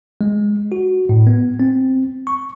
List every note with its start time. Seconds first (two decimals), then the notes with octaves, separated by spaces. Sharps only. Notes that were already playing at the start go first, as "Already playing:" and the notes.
0.21 G#3
0.72 F#4
1.09 A2
1.27 B3
1.60 C4
2.27 C#6